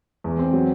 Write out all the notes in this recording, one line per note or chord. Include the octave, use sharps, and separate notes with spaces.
E2
C4
F#3